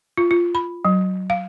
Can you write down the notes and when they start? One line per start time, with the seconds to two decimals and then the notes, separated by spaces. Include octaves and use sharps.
0.17 F4
0.31 F4
0.55 B5
0.85 F#3
1.30 F5